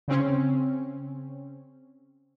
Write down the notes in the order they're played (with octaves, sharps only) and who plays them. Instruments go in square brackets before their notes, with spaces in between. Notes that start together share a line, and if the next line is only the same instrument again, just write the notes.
[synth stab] C#3 C4 C#4